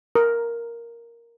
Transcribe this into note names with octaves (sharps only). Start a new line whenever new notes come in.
A#4